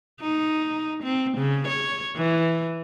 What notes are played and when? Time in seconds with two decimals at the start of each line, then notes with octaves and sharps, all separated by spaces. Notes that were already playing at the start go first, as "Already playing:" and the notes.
0.21 D#4
1.03 C4
1.38 C#3
1.68 C#5
2.16 E3